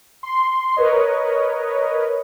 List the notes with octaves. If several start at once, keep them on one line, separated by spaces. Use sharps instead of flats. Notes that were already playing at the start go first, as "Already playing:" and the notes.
C6
A#4 B4 C#5 D#5